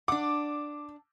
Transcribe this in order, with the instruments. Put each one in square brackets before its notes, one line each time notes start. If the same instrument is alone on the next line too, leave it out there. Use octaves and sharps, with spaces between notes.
[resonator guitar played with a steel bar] D4 F#5 [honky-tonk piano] D6